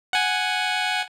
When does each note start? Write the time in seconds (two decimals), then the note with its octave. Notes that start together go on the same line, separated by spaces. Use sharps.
0.13 F#5 G#5